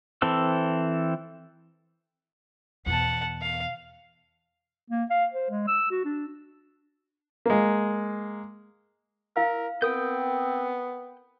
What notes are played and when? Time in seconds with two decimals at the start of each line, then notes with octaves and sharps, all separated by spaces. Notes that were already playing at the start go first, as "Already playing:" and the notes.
0.22 E3 C4 A4 E6
2.86 E2 B2 F#5 A5
3.42 F5
4.90 A#3
5.10 F5
5.33 C5
5.50 G#3
5.68 E6
5.91 F#4
6.05 D4
7.46 G#3 A#3
9.36 E4 A#4 F5 E6
9.82 B3 C4 A#4 G5 D#6 G6